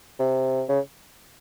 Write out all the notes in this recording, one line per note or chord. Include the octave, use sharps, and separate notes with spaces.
C3
C#3